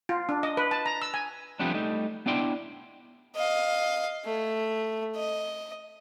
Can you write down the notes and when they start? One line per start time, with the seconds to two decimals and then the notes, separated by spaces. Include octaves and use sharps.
0.09 F4
0.29 D4
0.43 D#5
0.57 B4
0.71 A5
0.86 A#5
1.02 E6
1.14 G#5
1.59 F3 G3 A3 B3 C4 D4
1.74 G3 A3 D#4
2.26 B3 D4 E4 D5 G5 C6
3.36 D#5 F5
4.25 A3
5.16 D#5